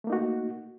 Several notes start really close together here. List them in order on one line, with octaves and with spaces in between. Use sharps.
A3 A#3 D#4 F#4